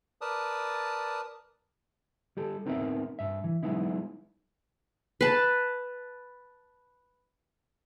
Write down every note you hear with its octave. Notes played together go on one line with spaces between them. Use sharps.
A#4 B4 D5 A5 D#6
G3 G4 A4
B3 C4 D#4 A#4 D5 E5
G2 E5
E3
F#3 G#3 B3 D#4 E4
B4 A5